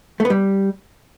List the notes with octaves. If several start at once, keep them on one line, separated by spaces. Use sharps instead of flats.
A3
B3
G3